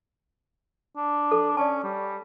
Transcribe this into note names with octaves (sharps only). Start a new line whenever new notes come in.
D4
A4
C#4 D5 A5
G3